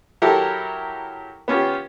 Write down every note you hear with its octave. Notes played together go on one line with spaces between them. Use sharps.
F#3 E4 G4 A4 A#4
B3 C#4 F4 G4